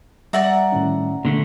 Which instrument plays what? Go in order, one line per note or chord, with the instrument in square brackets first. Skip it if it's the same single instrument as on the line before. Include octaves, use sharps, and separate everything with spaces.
[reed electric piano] G3 E5 [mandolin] D5 F#5 A#5
[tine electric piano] A2 D#3 C#4
[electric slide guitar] A#2 D3 A3